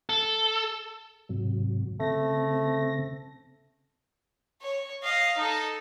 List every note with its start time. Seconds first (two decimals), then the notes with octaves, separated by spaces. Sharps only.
0.09 A4
1.29 G#2 C3 F#3
2.00 C#3 A3 C4 A#6
4.62 C#5
5.03 D#5 F5
5.38 D#4 A4